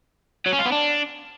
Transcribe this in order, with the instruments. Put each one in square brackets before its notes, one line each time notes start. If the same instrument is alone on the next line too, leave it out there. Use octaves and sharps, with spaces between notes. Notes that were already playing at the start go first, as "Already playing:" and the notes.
[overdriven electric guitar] F#3
C#4
F4
B3
D4